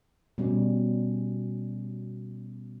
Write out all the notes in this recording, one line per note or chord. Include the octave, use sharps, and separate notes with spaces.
B2 G3 C#4